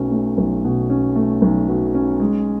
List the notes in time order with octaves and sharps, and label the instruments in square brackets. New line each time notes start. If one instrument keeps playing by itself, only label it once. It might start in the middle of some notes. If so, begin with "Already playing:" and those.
Already playing: [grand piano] B1 B2 A3 C#4
A3
B1
B2
C#4
A3
B1
B2
C#4
G#3